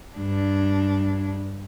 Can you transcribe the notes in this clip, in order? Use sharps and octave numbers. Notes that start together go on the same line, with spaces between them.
G2 D4